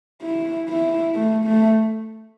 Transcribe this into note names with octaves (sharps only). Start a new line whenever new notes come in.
E4
E4
A3
A3